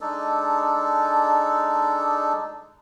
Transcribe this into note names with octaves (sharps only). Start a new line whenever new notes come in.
G#3 D4 D#4 A4